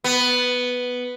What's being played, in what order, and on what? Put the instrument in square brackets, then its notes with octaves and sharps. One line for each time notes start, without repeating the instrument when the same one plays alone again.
[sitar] B3